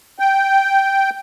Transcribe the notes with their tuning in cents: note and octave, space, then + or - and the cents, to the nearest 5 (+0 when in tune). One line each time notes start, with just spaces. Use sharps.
G5 -5